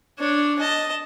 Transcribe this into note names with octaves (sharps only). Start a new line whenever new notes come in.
D4 C#5
D#5 A5